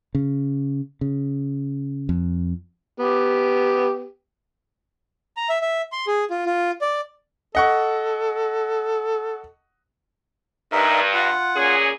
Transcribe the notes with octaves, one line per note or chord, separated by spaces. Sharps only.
C#3
C#3
F2
B3 G4
A#5
E5
E5
C6
G#4
F4
F4
D5
A4 D#5 F#5 C#6
G2 D#4 A#4 E5
F4 F#5
A#2 C#4 G#4